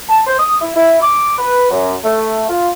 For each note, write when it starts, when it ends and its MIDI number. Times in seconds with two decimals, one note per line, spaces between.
0.09 0.20 81
0.26 0.38 72
0.38 0.59 87
0.61 0.70 64
0.76 1.00 64
1.01 1.34 86
1.38 1.69 71
1.70 1.95 42
2.04 2.47 57
2.49 2.69 65